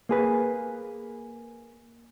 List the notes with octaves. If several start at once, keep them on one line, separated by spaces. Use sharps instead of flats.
A#3 G#4 B4